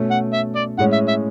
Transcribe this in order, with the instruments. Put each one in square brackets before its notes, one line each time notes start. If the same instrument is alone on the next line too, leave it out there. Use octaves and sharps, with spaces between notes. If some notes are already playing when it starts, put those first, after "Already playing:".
Already playing: [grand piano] B2 A3 C#4
[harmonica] F#5
E5
D5
[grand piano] A2 G#3 C#4 [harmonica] F#5
[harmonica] E5
E5